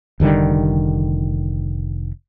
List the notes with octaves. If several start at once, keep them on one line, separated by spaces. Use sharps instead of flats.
F1 D3 D#3 G3